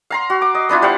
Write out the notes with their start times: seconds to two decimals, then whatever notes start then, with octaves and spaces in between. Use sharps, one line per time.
0.10 F5 A#5 C6
0.30 F#4
0.42 D6
0.55 D#5
0.69 B3 D4 E4 F4
0.82 G3 C5 F5 F#5